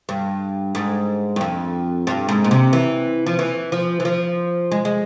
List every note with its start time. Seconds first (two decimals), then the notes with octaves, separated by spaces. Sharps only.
0.09 G2
0.75 G#2
1.36 G2
1.41 F2
2.07 G2
2.29 G#2
2.44 A#2
2.51 C3
2.73 E3
3.26 F3
3.39 E3
3.72 F3
4.00 E3
4.05 F3
4.72 G#3
4.85 G#3